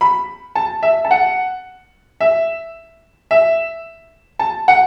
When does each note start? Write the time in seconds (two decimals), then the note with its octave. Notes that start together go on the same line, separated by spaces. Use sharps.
0.01 B5
0.55 A5
0.83 E5
1.05 A5
1.11 F#5
2.20 E5
3.31 E5
4.39 A5
4.68 F#5